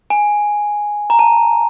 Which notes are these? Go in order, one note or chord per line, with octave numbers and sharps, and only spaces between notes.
G#5
A#5
A5